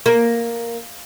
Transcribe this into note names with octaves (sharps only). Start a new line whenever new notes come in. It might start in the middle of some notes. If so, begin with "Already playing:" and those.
A#3